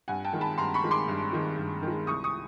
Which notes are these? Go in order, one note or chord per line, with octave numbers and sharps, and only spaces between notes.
G2 F#5 G#5
G5 A5
D#3 G#3
A5 B5
G2 A#5 C6
B5 C#6
D#3 G#3
C6 D6
G2
D#3 G#3
G2
D#3
G#3
C2 C#6 D#6
C#6 D#6